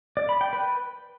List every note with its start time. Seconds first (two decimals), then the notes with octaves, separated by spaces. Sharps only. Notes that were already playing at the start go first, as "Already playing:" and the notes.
0.17 D5
0.29 B5
0.41 G5
0.53 B4